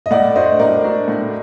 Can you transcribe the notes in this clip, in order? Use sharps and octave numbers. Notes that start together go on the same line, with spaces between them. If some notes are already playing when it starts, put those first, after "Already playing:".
D#5
A2 D5 F#5
A3 D4 F#4 C5 D#5
A2 A#4 D5
A3 D4 F#4
A2